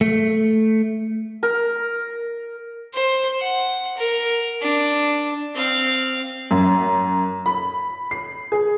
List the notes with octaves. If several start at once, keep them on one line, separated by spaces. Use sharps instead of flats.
A3
A#4
C5
F#5
A#4
D4
C4 F5
F#2
B5
C7
G#4